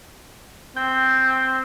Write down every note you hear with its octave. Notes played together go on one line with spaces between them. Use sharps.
C4 G5